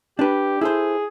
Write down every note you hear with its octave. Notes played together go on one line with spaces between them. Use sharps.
D4 G4 B4
E4 G#4 A4 C5